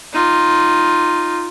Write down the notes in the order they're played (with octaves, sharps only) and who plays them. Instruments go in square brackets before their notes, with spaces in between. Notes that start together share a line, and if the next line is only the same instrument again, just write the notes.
[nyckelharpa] D#4 F4